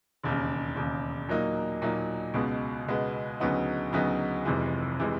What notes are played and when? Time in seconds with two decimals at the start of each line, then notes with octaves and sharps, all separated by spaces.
0.23 E1 D#2 C#3
0.76 E1 D#2 C#3
1.28 A#2 F#3 A#3 D#4
1.82 A#2 F#3 A#3 D#4
2.34 C#2 B2 G#3 B3
2.86 C#2 B2 G#3 B3
3.40 D2 C#3 F#3 B3 D#4
3.92 D2 C#3 F#3 B3 D#4
4.45 F1 F2 C3 E3 G#3
4.99 C3 E3 G#3